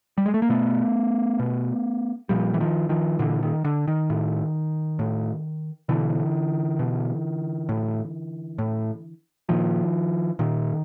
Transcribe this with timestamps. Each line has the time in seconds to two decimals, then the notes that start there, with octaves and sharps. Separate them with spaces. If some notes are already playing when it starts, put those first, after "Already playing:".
0.18 G3
0.26 G#3
0.34 A3
0.42 A#3
0.49 B2 A3 B3
1.39 B2
2.29 A#2 F3 G3
2.54 E3
2.60 D#3 F3
2.89 D#3 F3
3.19 A#2 D3 E3
3.43 D#3
3.65 D3
3.88 D#3
4.10 A2
4.99 A2
5.89 B2 D3 E3
6.79 B2
7.69 A2
8.58 A2
9.49 A#2 D#3 F3
10.39 A#2 D#3